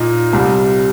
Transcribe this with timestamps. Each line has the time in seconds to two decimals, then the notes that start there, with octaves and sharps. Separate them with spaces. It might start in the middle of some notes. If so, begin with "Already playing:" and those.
Already playing: A#2 A#3 D#4
0.33 C2 C3 G3